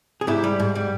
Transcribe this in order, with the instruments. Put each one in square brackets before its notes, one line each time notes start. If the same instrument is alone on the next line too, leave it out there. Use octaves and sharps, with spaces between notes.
[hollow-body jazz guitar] G#4
G#2 E4 G4
G3
G#2
G3